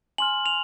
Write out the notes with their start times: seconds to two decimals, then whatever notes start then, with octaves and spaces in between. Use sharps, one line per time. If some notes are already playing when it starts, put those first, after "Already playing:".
0.18 G#5 C6 F6 F#7
0.46 F7